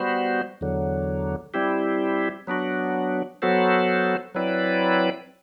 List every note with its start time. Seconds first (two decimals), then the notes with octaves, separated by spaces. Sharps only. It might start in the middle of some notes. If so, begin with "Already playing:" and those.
Already playing: G3 B3 F#4 C5
0.61 E2 D3 F#3
1.54 G3 C4 E4 G4
2.47 F#3 B3 D4 F#4
3.42 F#3 B3 F#4 A4 C5
4.35 F#3 C4 E4 B4 D5